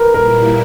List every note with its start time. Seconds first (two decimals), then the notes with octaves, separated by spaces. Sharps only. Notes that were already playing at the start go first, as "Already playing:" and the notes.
Already playing: A#4 B4
0.13 A#2 G3 A#3 E4 A#4